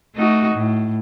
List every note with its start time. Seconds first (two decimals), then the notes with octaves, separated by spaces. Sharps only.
0.15 A3 D#4 F#4
0.54 A2